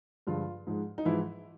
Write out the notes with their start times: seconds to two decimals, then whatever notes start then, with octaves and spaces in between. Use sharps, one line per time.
0.27 G2 D3 F3 G#3 F4
0.67 G#2 F3 G#3
0.98 D#4
1.05 G#2 E3 F3 G#3 E4